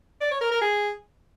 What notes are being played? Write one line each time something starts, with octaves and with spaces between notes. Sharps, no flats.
D5
C#5
A#4
A#4
G#4